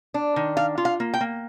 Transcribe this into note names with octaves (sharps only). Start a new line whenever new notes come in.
D4
D#3
D4 F5
F4
F5
A#3
G5
A#3